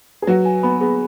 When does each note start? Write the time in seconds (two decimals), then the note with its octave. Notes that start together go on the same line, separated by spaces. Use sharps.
0.22 G#4
0.27 F#3 F#4 B4
0.45 G#5
0.63 B3 B5
0.81 B3 G#4